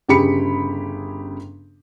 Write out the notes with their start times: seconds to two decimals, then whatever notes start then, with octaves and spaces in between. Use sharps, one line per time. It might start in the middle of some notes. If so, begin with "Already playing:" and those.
0.08 G1 C#3 G4 G#4 B5 C#7